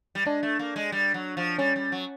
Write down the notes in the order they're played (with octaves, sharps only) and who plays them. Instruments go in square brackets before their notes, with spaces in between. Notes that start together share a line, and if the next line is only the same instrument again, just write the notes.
[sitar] G3
[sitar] G#3 [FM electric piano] D4
[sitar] A3
A#3
G#3
G3
F#3
F3
[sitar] G3 [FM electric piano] C#4
[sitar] G3
F#3